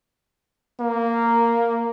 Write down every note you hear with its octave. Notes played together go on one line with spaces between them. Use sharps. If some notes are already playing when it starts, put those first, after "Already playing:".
A#3